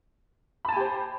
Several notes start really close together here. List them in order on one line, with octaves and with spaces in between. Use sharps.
B5 A5 G#5 G4 C5